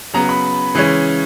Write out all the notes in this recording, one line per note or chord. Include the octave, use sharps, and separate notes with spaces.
C#3 F#3 B3 A#5
B5
C#3 E3 G#3 C#4